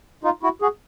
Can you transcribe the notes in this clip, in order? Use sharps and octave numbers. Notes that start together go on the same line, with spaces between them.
D#4 F4
E4 F#4
F#4 G#4